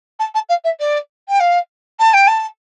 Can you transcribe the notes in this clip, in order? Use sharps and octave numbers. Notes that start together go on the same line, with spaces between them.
A5
A5
F5
E5
D5
G5
F5
A5
G5
A5